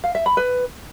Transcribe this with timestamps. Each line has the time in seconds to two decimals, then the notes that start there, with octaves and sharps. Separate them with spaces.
0.04 F5
0.15 E5
0.26 B5
0.37 B4